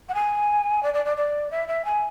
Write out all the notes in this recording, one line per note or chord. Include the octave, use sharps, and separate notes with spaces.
F#5
G#5
D5
D5
D5
D5
E5
E5
G#5